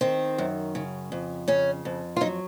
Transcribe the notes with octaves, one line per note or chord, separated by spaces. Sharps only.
D#3 C4
F#2
C#3
F2
C#3 C#4
F2
F4
F#3 D#4